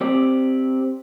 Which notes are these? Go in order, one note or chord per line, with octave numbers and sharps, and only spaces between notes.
C4 G4 D5